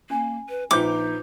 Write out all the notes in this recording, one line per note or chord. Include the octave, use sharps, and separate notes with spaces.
A#3 C#4 G#5
B4
A#1 D#4 F4 B4 C5 G5 D6 G6